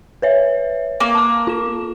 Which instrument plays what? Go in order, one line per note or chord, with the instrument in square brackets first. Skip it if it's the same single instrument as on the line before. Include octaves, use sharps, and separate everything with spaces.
[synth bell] B4 C#5 E5
[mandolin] A#3
[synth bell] A5 D6
F4 E7